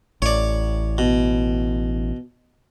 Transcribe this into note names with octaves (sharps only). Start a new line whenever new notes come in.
A1 C#5 D5
B2